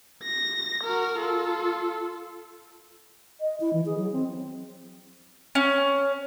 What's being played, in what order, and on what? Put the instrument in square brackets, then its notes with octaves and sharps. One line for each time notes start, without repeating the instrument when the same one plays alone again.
[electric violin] A#6
F#4 A#4
F4 A4
[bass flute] D#5
E4
E3
G#4
F#3
C4
[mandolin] C#4